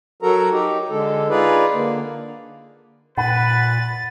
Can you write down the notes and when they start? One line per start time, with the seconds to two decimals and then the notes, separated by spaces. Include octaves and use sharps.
0.22 F#3 F#4 A4 A#4 A#5
0.51 D#4 G4
0.90 D3 G#3 A4
1.30 D#4 F4 G#4 B4 D5
1.73 D3 A#3
3.17 A#2 B4 F#5 B5 A6